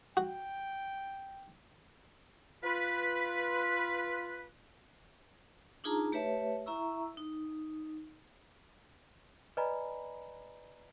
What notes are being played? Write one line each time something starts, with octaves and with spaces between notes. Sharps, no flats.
F#4 G5
F4 B4
D4 D#4 F4 G#4 A5 A#5
A3 G4 B4 C#5 E5 A5
E4 E5 A#5 C#6 E6
D#4
B4 D5 D#5 G#5 A#5 B5